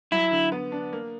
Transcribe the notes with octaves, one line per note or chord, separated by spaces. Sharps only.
F#3 E4
D3
B3
D4
A#3